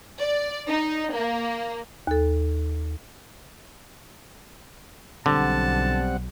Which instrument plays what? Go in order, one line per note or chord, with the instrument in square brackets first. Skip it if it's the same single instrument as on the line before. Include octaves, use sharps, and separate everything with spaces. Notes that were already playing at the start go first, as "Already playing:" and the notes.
[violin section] D5
D#4
A#3
[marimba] D#2 A4
[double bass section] B1 [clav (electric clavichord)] D3 [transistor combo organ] G3 C4 F#5 [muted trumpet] A5